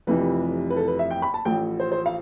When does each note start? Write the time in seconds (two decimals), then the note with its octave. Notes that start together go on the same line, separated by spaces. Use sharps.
0.07 F1 F2 C3 E3 B4
0.70 B4
0.76 A4
0.88 B4
0.99 E5
1.11 G5
1.22 B5
1.34 A5
1.45 A1 A2 F3 G5
1.80 C5
1.92 C5
2.06 F5